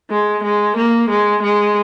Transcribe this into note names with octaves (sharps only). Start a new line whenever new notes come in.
G#3
G#3
A#3
G#3
G#3